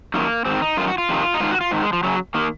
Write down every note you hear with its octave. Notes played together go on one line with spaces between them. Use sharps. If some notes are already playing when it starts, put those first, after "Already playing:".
F#2 D#3 A#3
G#2 D#3 C4
D#4
F#2 D#3 F4
F#4
F4
F2 C3 D#3
D#4
G#2 D#3 F4
F#4
F4
G#2 D#3
G#3
F3
F#2 C#3 F#3
D#3 A#3